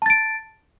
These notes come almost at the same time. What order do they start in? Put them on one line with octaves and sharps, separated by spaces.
A5 A6 D7